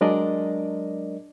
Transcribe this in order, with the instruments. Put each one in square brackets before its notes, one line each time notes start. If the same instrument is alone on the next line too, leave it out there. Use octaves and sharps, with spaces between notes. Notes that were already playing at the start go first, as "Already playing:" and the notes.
[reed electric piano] F#3 G#3 D4 A#4 D5 D#5